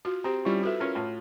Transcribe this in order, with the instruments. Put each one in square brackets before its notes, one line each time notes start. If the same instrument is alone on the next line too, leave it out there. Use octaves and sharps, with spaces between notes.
[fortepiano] F4 [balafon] F#4
[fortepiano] C4 [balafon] G4 C5 [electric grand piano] A#5
[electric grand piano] G3 C#4 E4 [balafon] F4
[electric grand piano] E4 B4 E5 [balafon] F#4 A4
[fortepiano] C#4 F4 A#4
A2 F4